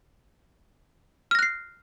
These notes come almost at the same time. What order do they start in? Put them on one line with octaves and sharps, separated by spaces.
F6 A#6 F#6 C7